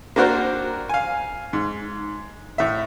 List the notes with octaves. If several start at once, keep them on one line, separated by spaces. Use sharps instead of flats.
A#3 C4 D4 F#4 A#4 C5
F5 G#5
G#2
A2 E5